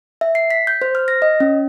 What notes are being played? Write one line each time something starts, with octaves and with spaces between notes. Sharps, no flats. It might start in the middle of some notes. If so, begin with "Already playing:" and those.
E5
C7
B6
G6
C5
F6
A#6
D#5
C#4